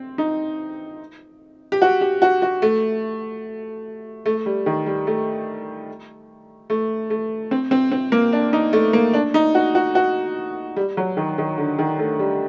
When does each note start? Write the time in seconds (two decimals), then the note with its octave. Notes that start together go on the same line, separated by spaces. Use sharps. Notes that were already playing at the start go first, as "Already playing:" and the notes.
Already playing: C4
0.18 D#4
1.72 G4
1.82 F#4
2.01 G4
2.22 F#4
2.42 F#4
2.62 A3
4.26 A3
4.46 G3
4.66 D#3
4.86 G3
5.07 A3
6.70 A3
7.10 A3
7.51 C4
7.71 C4
7.91 C4
8.12 A#3
8.33 D4
8.53 D#4
8.73 A3
8.93 A#3
9.14 D4
9.34 D#4
9.55 F#4
9.75 F#4
9.95 F#4
10.76 G3
10.97 F#3
11.17 D#3
11.38 D#3
11.58 D3
11.79 D#3
11.99 A3
12.19 G3